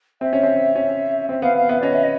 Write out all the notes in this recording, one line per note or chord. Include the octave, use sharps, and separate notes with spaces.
C4 E5
C#4
C4
C#4
C4 E5
B3 F5
F5
B3 E5
D5
C#4 D#5
E5
D#5